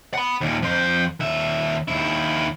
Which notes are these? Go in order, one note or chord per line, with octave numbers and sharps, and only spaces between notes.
F#5 B5
D#2 A#2
F2 C5
D#2 E5
D#2 E4